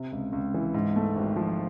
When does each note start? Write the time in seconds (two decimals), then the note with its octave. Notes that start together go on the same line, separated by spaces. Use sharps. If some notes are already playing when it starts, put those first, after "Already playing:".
Already playing: C3
0.12 C#2
0.33 C#2
0.54 E3
0.74 G#2
0.96 A3
1.16 G#1
1.36 F3